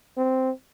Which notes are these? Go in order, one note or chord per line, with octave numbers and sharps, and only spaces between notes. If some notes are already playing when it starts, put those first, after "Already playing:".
C4